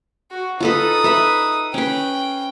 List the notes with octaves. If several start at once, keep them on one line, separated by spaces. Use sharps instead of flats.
F#4
D#4 F4 A4 B4 D#6
B4 E5 B5
C#4 B4 G5